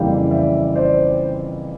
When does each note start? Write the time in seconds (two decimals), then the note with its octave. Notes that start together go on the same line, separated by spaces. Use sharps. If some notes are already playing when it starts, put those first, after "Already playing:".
Already playing: F2 C#3 E3 G3 A#3 F5 G5
0.31 D5 E5
0.75 C5 D5